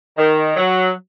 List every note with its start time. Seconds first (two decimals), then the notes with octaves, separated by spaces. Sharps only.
0.18 D#3
0.56 F#3